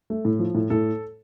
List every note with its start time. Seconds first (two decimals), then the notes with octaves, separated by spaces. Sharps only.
0.10 A3
0.25 A2
0.39 F3
0.55 A2
0.70 A2 A4